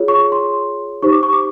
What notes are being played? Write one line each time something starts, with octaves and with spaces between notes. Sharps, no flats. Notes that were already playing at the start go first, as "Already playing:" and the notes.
Already playing: F4 G#4 C#5
C#6
C6
D#4 G4 C5 C#6
D6
C#6
D6